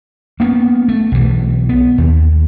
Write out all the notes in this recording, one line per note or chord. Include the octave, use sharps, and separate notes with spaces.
A#3 B3 C#4
A3
B1 E3
B3
D#2